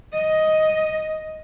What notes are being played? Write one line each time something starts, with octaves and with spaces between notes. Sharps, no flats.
D#5